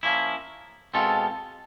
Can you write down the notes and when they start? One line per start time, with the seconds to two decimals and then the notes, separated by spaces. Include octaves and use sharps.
0.03 F3 A#3 C#4 E4
0.94 B2 G#3 C4 F4 A4